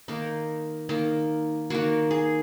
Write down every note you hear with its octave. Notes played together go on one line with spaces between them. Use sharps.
D#3 A#3 D#4
D#3 A#3
D#3 A#3 F#4
G#4